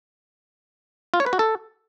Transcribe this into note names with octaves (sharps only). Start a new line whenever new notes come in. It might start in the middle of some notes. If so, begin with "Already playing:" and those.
F4
C#5
B4
F#4
A4